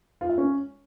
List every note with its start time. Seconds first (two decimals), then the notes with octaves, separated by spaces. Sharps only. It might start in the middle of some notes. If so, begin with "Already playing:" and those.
0.21 F4
0.29 E5
0.38 C#4